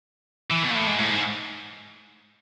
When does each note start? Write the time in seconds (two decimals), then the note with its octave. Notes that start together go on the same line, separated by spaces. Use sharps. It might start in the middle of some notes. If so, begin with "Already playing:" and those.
0.50 E3
0.63 B2
0.70 A#2
0.75 A2
0.87 G#2
0.99 A2
1.10 G#2